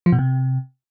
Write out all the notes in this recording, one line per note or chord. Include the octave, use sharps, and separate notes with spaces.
F3
B2
C3